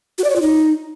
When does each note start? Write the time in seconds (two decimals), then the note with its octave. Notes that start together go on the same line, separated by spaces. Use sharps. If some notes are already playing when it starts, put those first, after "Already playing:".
0.18 F#4
0.24 D5
0.30 C#5
0.36 F4
0.41 D#4